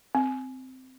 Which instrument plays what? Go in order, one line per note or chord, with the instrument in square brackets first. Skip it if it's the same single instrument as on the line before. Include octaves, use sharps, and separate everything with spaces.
[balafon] C4